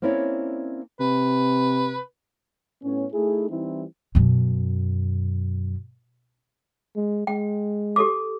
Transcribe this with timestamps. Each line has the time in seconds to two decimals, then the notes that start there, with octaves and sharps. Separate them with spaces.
0.02 A#3 C4 C#4 E4 C#5 D5
1.00 C3 B4
2.83 A2 B3 C#4
3.12 A3 D#4 E4 G#4
3.49 E3 G3 C4 D#4 E4
4.15 F#2 B2
6.96 G#3
7.27 G#3 G5
7.96 G4 A4 D6